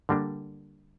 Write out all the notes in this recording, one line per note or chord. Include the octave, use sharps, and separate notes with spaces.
D3 G3 A#3 D4